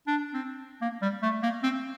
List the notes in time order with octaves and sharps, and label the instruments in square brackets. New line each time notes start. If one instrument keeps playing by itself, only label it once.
[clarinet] D4
C4
A#3
G3
A3
A#3
C4